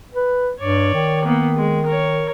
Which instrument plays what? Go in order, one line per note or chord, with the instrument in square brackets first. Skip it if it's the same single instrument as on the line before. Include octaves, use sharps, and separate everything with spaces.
[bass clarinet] B4
[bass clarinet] G2 [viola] C#5 D5
[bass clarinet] D#3
[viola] A#3 B3
G#3
A#4 C#5